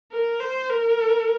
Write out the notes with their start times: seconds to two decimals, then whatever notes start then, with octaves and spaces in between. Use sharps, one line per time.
0.11 A#4
0.40 C5
0.69 A#4